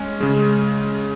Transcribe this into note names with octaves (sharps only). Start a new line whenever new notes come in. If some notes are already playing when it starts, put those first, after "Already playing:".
Already playing: G#3 C#4
C#3 G#3